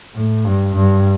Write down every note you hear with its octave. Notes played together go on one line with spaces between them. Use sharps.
A2
G2
G2